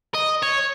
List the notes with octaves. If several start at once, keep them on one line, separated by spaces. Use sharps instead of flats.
D#5
C#5